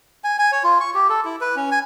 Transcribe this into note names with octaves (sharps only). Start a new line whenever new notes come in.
G#5
G#5
C#5
F4
C#6
G4
A4
E4
B4
C#4
G#5